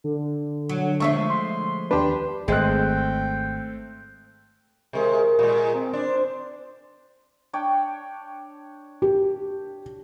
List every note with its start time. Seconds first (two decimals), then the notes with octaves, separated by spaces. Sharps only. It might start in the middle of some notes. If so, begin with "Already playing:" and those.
0.04 D3
0.69 F#3
1.00 F3 G#3 A3 E5 C#6
1.30 C6
1.91 D#2 D4 G4 B4
2.48 G#1 G#3 A3 C4 G5 F#6
4.93 C3 G#3 A#4
5.39 A#2 G#3
5.74 C4
5.93 D4 C5
7.53 D4 C#5 G5
9.02 G4